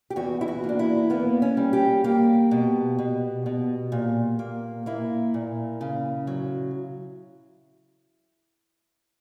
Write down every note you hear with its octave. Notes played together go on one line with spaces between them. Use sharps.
G4
E2 F#4
E4
F#4
A#3
D4
E4
A#3 B3
C#4
G3
G4
A#3 G4
B2
B2
B2
A#2
A#3
A#3 E4
A#2
C#3
F#3